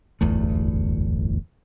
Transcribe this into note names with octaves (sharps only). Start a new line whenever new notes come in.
D1 G1 E2 A3